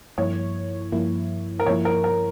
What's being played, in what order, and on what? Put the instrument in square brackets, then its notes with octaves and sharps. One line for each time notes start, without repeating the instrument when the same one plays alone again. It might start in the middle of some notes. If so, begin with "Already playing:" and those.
[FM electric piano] G2 F3 A#3 E4 [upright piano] C#5
[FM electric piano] G2 F3 A#3 E4
[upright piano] A#4
[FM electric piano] G2 F3 A#3 E4 [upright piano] C#5
[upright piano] A#4
A#4